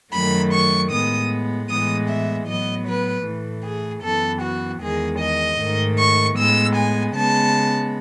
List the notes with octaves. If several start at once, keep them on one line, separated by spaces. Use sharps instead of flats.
F#2 D#3 F#3 A3 B5
C#6
A2 G#3 B3 D#6
A2 E3 G#3 B3 D#6
E5
A2 F#3 B3 D#5
B4
A2 E3 A3
G#4
F#2 E3 B3 A4
F#4
E2 D#3 G#3 G#4
D#5
G#2 D#3 A3
C#6
A2 G#3 B3 E6
G#5
C#3 G#3 B3 A5